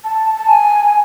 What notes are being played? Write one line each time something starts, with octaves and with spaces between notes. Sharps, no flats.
A5
A5
G#5